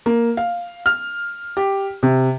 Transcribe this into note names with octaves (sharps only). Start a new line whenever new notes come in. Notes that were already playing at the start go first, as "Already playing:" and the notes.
A#3
F5
F6
G4
C3